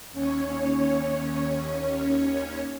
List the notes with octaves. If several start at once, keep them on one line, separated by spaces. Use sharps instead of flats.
D#2 C#4 C#5